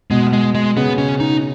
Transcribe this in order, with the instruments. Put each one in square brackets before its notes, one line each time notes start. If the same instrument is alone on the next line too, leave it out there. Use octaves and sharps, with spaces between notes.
[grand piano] B2 [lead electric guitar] G#3
[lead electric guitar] G#3
G#3
[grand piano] C#3 [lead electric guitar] B3
[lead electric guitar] C#4
D#4